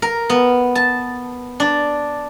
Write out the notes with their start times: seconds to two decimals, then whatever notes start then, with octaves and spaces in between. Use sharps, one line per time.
0.02 A#4
0.30 B3
0.75 A5
1.60 D4